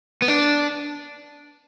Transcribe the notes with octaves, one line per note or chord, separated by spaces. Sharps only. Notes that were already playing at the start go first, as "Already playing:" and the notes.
B3
D4